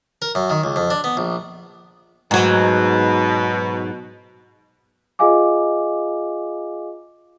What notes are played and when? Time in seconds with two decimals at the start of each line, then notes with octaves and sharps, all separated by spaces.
0.22 A#4
0.35 F#2
0.50 D#3
0.64 C#2
0.76 F2
0.90 D4
1.04 B3
1.17 A#1
2.31 G#2 B2 F#3
5.19 F4 G#4 D#5 F5 G#5 D6